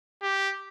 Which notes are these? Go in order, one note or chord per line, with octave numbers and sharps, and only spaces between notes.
G4